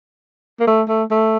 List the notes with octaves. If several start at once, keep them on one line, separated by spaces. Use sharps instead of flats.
A#3
A3
A3
A3